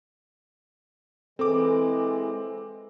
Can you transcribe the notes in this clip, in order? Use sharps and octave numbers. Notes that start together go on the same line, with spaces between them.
E3 G#3 C4 A4 D6